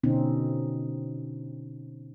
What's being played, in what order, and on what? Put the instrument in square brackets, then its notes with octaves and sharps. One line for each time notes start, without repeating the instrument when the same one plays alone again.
[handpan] B2 D3 C4 C#4 D#4